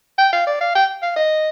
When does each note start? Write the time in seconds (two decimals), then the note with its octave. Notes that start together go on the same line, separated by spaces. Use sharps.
0.18 G5
0.33 F5
0.47 D5
0.60 F5
0.75 G5
1.02 F5
1.16 D#5